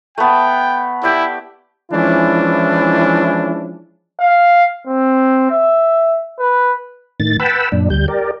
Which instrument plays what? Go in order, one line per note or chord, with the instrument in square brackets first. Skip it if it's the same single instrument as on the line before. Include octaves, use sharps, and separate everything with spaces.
[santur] A3 B3 [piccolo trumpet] G5
[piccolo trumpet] E4 [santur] G4 D5
[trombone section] E3 F3 G#3 C#4 D4 E4
[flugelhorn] F5
C4
E5
B4
[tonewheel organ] A2 D#3 A6
B4 F#5 G5 A5 B5 E6
F#2 A#2 D4
D2 G3 G6
G4 A#4 D5